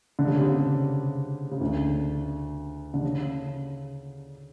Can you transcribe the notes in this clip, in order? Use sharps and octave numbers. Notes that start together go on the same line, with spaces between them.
D3
C#3
C3
C#3
C#3
D2 D3
D3
C#3